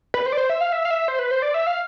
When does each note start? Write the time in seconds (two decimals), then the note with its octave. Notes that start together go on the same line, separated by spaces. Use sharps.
0.14 B4
0.26 C5
0.32 D5
0.37 C5
0.50 E5
0.61 F5
0.72 E5
0.85 F5
0.91 E5
1.08 C5
1.19 B4
1.31 C5
1.42 D5
1.54 E5
1.67 F5